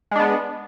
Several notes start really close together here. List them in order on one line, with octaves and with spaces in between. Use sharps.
G#3 D4 B3